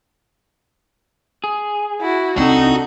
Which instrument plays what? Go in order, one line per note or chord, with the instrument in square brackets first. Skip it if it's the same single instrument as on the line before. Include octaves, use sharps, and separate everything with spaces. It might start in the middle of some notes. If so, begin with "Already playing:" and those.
[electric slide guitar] G#4
[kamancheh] E4 F#4
[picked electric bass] C2 C4 [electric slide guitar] D4 A4 [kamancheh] D#4 [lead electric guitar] F#4